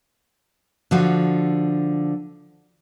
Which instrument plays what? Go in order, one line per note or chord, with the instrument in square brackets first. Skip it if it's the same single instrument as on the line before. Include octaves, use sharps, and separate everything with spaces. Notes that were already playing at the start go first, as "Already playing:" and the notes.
[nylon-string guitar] D3 F3 F#4